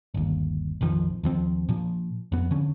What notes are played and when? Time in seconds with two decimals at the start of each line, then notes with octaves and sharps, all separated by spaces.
0.14 G1 D#2
0.81 A#1 F2 D#3 F3
1.23 D#2 F3 C4
1.69 A#2 F3
2.32 F2 B3
2.51 D3 C#4